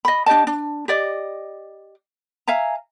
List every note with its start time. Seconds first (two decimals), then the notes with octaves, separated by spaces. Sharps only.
0.05 D#5 B5
0.26 D4 G4 D#5 A5
0.47 D4
0.88 G4 D5 D#5
2.48 E5 F5 G#5 A#5